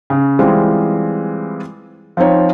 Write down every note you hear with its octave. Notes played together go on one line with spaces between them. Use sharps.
C#3
E3 G3 G#3 C4 F4
F3 C4 D#4 C#5